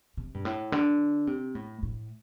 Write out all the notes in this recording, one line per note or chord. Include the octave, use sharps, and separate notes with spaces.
C3
G2
A2
D3
C3
A2
A2